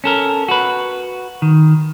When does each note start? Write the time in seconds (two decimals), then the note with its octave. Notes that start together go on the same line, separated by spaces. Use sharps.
0.04 C#4 A4 A#4
0.48 F#4 B4
1.42 D#3